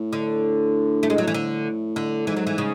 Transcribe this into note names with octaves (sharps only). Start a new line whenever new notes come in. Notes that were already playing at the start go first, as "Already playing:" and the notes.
Already playing: A2
D3
A3
G#3
F#3
E3
D3
D3
G#2 E3
F#3
E3
C#3